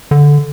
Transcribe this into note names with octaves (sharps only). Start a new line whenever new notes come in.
D3